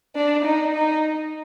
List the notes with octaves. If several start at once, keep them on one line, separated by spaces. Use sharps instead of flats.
D4
D#4
D#4